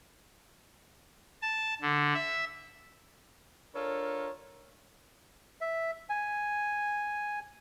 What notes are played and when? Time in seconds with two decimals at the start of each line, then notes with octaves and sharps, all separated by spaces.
1.42 A5
1.82 D3
2.14 E5
3.75 D4 F4 A4 A#4 C#5
5.61 E5
6.10 G#5